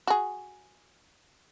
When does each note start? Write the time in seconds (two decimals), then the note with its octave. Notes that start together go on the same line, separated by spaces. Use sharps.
0.07 F#4 G#4